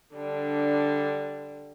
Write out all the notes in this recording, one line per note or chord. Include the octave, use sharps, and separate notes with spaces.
D3 G3 D4